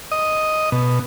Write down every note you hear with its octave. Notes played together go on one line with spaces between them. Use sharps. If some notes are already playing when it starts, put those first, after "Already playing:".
D#5
B2